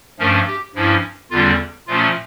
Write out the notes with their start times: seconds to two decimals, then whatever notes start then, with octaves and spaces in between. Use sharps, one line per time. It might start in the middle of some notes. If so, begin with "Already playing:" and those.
0.19 G2 F3 A3 C#4 A#4
0.47 G4
0.75 G2 F3 C#4 E4
1.31 E2 D3 G3 C#4 F4
1.88 A#2 F3 A3 C#4 F4